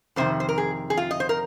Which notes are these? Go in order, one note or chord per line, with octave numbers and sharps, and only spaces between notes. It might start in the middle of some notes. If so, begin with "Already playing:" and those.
F2 C3 D#3 C5
C5
A#4
G#4
G#4
F4
D#5
C5
A#4